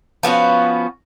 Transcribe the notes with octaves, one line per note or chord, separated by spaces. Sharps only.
F3 B3 C#4 F#4